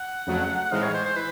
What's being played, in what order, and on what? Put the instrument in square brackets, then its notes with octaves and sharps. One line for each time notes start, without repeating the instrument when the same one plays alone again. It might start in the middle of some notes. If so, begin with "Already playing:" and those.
Already playing: [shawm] F#5
[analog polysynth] F2 C#3 F#3 A3
[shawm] F#5
[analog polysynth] A2 E3 G#3 C4 D#4 [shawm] F5
[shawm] C#5
C5
C5
[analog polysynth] E3 [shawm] B4